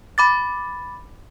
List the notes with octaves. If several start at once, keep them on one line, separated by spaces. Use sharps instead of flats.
B5 D6 A6